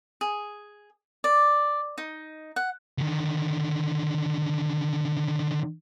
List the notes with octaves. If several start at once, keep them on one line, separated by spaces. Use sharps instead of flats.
G#4
D5
D#4
F#5
D3 D#3